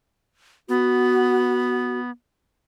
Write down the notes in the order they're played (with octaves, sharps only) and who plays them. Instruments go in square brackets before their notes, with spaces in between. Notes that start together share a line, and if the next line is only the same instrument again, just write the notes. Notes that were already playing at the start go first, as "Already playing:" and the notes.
[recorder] B3 [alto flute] F#4